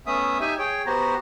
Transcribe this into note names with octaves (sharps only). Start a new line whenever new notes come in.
A3 B3 C#4 E5 D#6
D#4 G4 E5 G#5
G#4 C#5 G5
B3 F#4 G4 C5 A#5